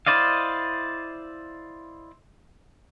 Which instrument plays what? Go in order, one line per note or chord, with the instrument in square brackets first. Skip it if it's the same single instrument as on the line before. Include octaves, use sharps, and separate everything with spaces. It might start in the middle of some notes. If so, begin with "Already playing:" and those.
[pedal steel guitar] E4 C5 D5 D#5 F5